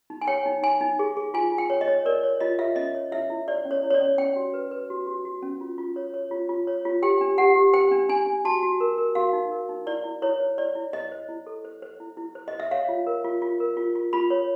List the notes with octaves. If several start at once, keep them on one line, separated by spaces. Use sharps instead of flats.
D#4
G#5
C#5 G5
D#4
D#4 G#5
D#4
G#4
G#4
F4 G#5
F4
G5
C#5
D#5
C#5
A#4 D5
C#5
F4 D#5
F4 E5
C#4 D#5
C#5
E4 E5
E4
C#5 D5
C#4
C#5
E4
C#5
D5
C#4
C#4 G5
F#4
B4
B4
F#4
F#4
F#4
C#4
F4
F4
C#5
C#5
F4
F4
C#5
F4
G4 G5
D4
G4 F#5
G4
C5 G5
D4
D4 G#5
D4
F#4 A5
F#4
A#4
A#4
F#4 F5
D#4
A#4
D#4
E4 D5
E4
E4 C#5
C5
E4 D5
E4
C5 D#5
C5
E4
A4
C5
C5
E4
E4
C5
D#5
C5
E5
C#5 F5
F4
A#4
F4
F4
A#4
F4
F4
F4 B5
C#5